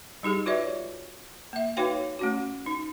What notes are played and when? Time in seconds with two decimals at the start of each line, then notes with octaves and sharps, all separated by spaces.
0.23 G3 D#4 G4 G#4
0.46 F4 F#4 B4 C#5 D5 E5
1.53 A#3 E5
1.77 D#4 F#4 B4 C#5 F5 G5
2.19 A3 C#4 F#4
2.66 D#4